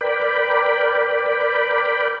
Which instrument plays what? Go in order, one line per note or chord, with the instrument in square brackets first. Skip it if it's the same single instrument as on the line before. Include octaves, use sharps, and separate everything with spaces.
[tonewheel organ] A#4 B4 D5 G5 B5